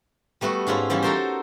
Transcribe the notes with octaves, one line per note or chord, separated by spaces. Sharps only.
G3 A3 B3 F#4
G#2 C#4 E4 F4
E3 F3 G3 C#4 E4
D#4 F#4 A4 A#4 C5